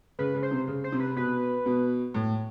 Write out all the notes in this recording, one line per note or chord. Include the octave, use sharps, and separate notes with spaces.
C#3 B4
C#3
C5
C3
C#3
C5
C3
B4
B2 B4
B2
A2